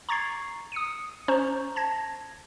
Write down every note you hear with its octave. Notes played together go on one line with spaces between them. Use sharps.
A#5 C#6 G#6 A6 C7
D#6 C#7 D#7
C#4 C5 A#5 C#6
A5 G#6 A#6